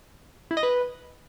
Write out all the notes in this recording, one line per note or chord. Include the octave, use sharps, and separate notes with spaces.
E4
D#5
B4